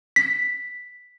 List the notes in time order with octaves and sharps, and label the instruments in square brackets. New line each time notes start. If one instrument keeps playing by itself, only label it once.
[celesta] B6